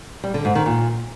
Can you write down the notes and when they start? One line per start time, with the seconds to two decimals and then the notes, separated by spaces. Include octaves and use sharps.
0.24 G3
0.34 D3
0.45 G#2
0.55 D#3
0.66 A#2